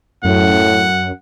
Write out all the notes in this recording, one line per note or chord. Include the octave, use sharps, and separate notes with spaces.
F#2 A2 F#5